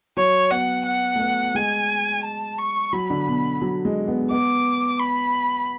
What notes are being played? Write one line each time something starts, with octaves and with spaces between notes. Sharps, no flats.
F#3 C#5
B3 F#5
F#5
A3
B3
G#3 G#5
A5
C#6
F#3 B5
D3
B2
F#3
G#3
B3
B3 D6
B5